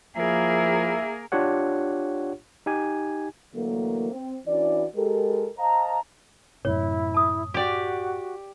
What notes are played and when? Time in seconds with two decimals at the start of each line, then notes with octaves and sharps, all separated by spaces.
0.17 F3 A#3 E4 G#4 A#4 E5
1.32 D4 F4 G4 C#5 F#5
2.66 D#4 G4 G#5
3.55 D3 E3 F#3 A3 A#3
4.12 C4
4.47 E3 C#4 D4 E4 F#4 D5
4.95 G#3 G4 A4 A#4
5.59 C5 D#5 F5 A5 A#5
6.65 F#2 A2 C3 E4 C#5
7.14 A5 D#6
7.54 F#4 G4 D5